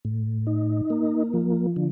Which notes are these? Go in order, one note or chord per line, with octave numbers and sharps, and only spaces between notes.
A2
D#4
A#3
F3
D3